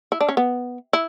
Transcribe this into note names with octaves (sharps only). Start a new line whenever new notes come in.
E4
D4
C#4
B3
E4